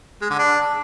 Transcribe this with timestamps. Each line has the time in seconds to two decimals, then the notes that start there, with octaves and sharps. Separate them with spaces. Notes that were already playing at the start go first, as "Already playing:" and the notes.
0.21 G#3
0.30 D3
0.39 D4